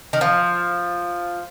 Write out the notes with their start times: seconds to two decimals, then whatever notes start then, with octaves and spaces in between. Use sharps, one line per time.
0.13 D#3
0.21 F3